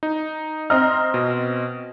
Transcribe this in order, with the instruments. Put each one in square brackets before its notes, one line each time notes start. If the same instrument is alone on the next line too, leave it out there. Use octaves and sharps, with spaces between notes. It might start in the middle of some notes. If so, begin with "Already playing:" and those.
[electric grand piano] D#4
[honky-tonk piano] C4 D#5 F6 [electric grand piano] A#5
[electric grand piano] B2